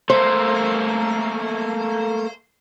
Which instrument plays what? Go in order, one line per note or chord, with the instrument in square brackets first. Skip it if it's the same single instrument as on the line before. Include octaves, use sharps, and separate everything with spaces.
[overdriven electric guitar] A3 A#3 [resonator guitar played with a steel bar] C5